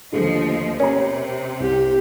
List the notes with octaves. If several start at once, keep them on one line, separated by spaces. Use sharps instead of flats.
D#2 D3 F3 G#3 A3 D#5
C3 C#4 A#4 A#5
C2 G4